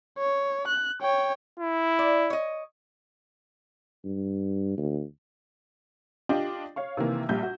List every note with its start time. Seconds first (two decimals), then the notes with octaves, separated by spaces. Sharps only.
0.18 C#5
0.68 F#6
1.02 C#5 G5
1.60 E4
1.99 D5
2.30 C#5 D#5
4.05 G2
4.78 D2
6.29 D4 F4 G4 D#5 G5
6.76 C#5 F5 C#6
6.97 C3 D#3 E3 A#3
7.29 A#1 G3 G6
7.43 F#4